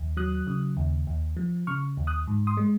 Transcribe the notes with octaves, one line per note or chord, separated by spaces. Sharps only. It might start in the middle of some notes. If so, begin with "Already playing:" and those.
Already playing: D#2
F#3 D#6 F#6
C#3
D#2
D#2
F3
C#3 C#6 F6
D#2
D#6 F#6
G#2
C6 D#6
G#3